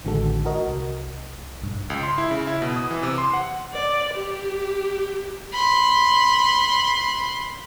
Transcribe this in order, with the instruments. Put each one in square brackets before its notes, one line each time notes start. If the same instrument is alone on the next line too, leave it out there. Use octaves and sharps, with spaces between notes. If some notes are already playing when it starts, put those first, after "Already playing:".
[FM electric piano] A1 D3 D#3 G#3 F#4 A4
F#4 A#4 D#5
C2
B1 G2
[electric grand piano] C#2
C6
E4
C#3
E4
B2
D#6
E3
C3
C6
F#5
[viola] D5
G4
[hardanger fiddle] B5 C6